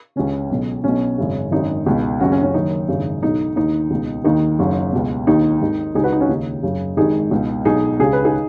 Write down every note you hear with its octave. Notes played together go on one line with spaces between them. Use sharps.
C#2 C#3 C#4
B1 B2
B1 B2 C#4
G#1 F#2 C#3
G#1 F#2 D#3 D#4
C#2 B2
F#1 F#2 C#3 C#4 F#4
C#4
C#4
F#1 F#2 D#3 D#4
G#1 F#2 C#3
B1 B2 D#4
D#2 D#3 D#4
C#2 B2
D#2 D#3 D#4
F#1 F#2 C#3
C#2 B2
D#2 D#3 D#4
G#1 G#2 D#3
C#2 C#3 D#4 G#4
F#4 B4
D#4
C#4 F#4
D#2 C#3 D#4
F#1 F#2 C#3
G#1 G#2 D#3 D#4 G#4
C#2 B2
B1 B2 D#4 G#4
C#2 C#3 G#4
B4
D#4 G#4